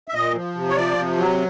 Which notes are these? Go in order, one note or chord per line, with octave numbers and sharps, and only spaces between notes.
E5
A#2 D#5
F3
C3
C#5
F3 D5
C3
F#3